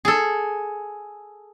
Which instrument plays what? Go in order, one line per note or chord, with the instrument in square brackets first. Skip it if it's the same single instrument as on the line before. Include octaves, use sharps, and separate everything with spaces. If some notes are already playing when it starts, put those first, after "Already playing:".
[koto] G#4 A4